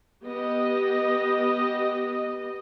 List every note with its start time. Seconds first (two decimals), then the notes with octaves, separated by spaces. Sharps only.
0.24 B3 G4 D#5